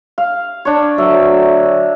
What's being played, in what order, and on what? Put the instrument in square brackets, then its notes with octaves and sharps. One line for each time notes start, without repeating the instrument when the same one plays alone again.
[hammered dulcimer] F5
D4 C#5
[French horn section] D2 F#3 [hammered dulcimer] E5